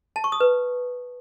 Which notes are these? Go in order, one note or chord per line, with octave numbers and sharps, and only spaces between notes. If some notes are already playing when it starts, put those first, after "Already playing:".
A5
C#6
D#6
B4